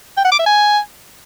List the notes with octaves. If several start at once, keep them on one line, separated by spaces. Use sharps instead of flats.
G5
F#5
D6
E5
G#5